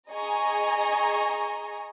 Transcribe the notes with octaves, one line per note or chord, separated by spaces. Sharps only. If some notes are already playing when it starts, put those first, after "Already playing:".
G#4 D#5 G#5 A#5 C#6